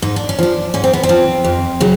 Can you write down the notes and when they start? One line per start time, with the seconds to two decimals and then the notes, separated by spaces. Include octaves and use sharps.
0.02 G#2 D#4
0.16 D4
0.29 C#4
0.39 F3 D4
0.74 G#2 C#4
0.84 C4
0.93 B3
1.03 C4
1.09 F3
1.44 F2
1.80 C#3 F#3